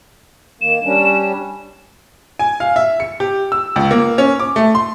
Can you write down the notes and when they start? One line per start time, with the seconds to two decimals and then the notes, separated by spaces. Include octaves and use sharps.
0.61 D#3 A#3 E7
0.84 G3 C#4 D4
2.39 G#5
2.60 F5
2.76 E5
3.00 C#7
3.20 G4
3.52 E6
3.76 C#2
3.91 A#3
4.18 C#4
4.40 D6
4.56 A3
4.75 C6